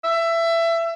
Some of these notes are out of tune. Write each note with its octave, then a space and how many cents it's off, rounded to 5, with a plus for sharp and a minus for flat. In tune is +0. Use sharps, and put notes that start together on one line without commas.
E5 +20